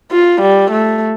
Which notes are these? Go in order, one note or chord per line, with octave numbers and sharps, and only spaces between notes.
F4
G3
A3